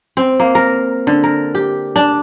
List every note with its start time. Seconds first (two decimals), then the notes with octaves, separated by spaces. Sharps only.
0.17 C4
0.40 A#3
0.55 A#4
1.07 D3
1.24 A#4
1.55 G4
1.96 D4